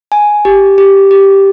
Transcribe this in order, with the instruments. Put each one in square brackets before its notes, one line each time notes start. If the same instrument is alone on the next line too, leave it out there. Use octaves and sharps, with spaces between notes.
[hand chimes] G#5
G4
G4
G4